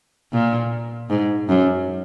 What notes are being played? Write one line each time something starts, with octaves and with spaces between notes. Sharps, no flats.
A#2
G#2
F#2